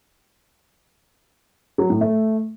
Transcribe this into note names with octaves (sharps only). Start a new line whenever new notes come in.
F#3
A2
A3